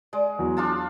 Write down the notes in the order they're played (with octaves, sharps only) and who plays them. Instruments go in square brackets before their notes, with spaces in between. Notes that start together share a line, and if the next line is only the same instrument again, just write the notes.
[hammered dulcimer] G#3 [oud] D5 D#5
[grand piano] E2 F#3
[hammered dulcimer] D4 F4 A5